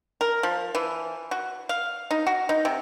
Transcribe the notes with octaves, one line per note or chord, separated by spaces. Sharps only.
A#4
F3
E3
F#4
F5
D#4
F#4
D#4
C3